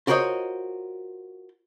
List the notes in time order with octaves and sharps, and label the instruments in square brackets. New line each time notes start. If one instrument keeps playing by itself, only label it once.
[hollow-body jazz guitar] F4 F#4 A#4 C5 C#5 D#5